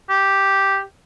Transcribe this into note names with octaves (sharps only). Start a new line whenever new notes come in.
G4